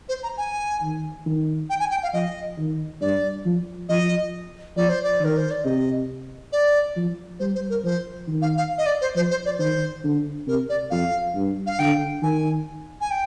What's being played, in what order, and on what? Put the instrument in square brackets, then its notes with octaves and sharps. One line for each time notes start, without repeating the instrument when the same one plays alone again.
[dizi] C5
A#5
G#5
[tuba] D#3
D#3
[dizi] G5
G#5
G5
F5
[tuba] F3 [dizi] D#5
[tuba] D#3
[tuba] G2 [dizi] D5
[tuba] F3
[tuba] F3 [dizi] D#5
[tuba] F3 [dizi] D5
[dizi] C5
D5
[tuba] D#3 [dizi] A#4
[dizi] C5
D5
[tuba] C3 [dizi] D#5
[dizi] D5
[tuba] F3
[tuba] G3 [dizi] C5
[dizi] C5
A#4
[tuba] F3 [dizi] C5
[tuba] D#3
[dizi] F5
F5
D#5
D5
C5
[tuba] F3 [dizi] C5
[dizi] C5
D5
[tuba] D#3 [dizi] C5
[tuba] D3
[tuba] C3 [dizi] A#4
[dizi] D5
[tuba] F2 [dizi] F5
[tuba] G2
[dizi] F5
[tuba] D3 [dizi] G5
[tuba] D#3 [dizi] G#5
[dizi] G#5
G5